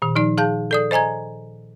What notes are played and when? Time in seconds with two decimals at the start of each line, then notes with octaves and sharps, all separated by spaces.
0.02 A#2 D#3
0.15 F3 D#4 D5
0.38 G#4 F5 A5 G6
0.71 A4 D5 D#6
0.91 C5 D#5 G#5 A#5 G#6